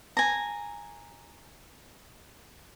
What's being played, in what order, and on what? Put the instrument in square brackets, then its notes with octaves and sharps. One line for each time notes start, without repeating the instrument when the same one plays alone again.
[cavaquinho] G#5 A#5